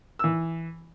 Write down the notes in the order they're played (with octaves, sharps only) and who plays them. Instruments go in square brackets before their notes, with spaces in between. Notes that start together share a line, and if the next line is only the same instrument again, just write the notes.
[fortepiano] E3 E6